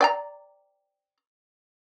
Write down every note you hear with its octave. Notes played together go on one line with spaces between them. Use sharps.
D5 G5 A#5